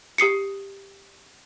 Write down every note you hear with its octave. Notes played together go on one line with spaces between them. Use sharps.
G4 D#6 C7 C#7